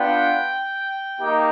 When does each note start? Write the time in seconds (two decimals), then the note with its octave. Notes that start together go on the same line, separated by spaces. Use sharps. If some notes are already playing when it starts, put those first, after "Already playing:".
Already playing: B3 D4 F4 G5
1.19 A#3 D#4 G4